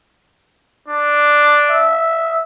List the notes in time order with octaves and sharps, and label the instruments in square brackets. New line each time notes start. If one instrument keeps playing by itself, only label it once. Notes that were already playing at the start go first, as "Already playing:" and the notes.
[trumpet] D4
[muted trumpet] E5